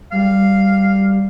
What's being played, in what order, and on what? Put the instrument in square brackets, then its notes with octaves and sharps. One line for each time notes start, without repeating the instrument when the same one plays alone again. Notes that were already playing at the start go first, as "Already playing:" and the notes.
[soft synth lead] G3 [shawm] F5